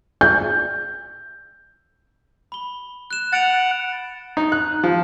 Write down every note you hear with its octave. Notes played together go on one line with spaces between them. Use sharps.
G6
B5 G7
F#6 E7
F#5 A6 D7 F7
D#4
F#6
F3